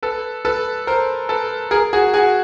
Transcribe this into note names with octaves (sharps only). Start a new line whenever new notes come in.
A4 B4
A4 B4
A#4 C5
A4 B4
G#4 A#4
F#4 G#4
F#4 G#4